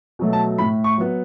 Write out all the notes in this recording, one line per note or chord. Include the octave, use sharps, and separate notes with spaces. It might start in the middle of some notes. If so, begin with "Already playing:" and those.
B2 F#3 A3
A5
A2 B5
C#6
F#3 B3